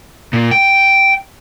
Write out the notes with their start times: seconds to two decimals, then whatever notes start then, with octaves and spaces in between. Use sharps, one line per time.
0.33 A#2
0.51 G5